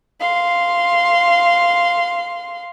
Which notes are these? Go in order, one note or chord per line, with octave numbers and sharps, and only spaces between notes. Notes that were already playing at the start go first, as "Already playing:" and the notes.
F5 C6